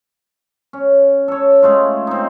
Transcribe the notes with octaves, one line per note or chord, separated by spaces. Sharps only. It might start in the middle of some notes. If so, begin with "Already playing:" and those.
C#4
A4 C#5
G#3 A3 F4
C4 D#4